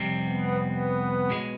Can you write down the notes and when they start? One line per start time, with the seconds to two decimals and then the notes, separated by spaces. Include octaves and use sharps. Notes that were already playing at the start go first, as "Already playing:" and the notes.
Already playing: F2 C3 G3 C4
0.27 B3
0.61 B3
1.29 B1 B2 G#3